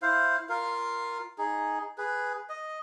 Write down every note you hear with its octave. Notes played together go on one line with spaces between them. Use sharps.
E4 C5 F5
F4 A#4 F5
D#4 G#4
G#4 B4
D#5